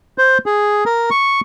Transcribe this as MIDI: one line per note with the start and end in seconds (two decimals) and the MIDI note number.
0.18 0.38 72
0.46 0.84 68
0.86 1.10 70
1.11 1.41 85